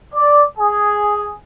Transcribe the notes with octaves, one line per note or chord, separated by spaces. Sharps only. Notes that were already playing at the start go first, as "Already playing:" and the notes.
D5
G#4